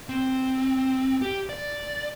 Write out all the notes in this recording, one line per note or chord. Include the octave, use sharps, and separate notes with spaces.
C4
G4
D5